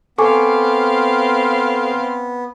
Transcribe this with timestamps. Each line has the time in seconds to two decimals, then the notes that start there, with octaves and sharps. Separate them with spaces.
0.18 B3 C4 A4 F5 G#5 C#6 D6